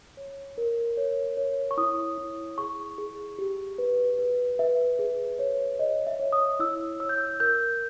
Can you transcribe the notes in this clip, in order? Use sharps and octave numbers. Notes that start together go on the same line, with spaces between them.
C#5
A#4
C#5
C#5
C#6
E4 D#6
E4
G#4 C#6
G#4
G4
B4
B4
B4 E5
G#4
C#5
C#5 D#5
E5
C#5
D#6
E4 E6
C#5 E6
G6
E6
A#4 G6